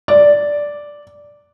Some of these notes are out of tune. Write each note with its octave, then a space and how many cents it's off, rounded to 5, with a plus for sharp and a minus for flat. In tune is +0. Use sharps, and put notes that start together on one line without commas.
D5 -5